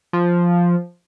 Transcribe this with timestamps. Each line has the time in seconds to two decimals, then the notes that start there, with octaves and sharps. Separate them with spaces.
0.13 F3